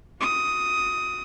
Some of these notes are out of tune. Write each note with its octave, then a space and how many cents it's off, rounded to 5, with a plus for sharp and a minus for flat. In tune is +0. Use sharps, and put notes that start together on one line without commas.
F#4 -25 D#6 +10